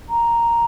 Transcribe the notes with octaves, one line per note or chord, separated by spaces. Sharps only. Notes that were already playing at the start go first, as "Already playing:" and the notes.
A#5